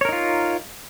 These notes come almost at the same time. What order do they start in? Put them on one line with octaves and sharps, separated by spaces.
C#5 A#4 D#4 F4